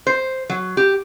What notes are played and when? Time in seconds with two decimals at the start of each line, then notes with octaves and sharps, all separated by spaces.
0.07 C5
0.49 F#3
0.77 G4